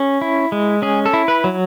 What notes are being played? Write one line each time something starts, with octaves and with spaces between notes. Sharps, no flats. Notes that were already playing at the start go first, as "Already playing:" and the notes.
Already playing: C#4 G#4
E4
G#3
C#4 G#4
A4
E4
B4
F#3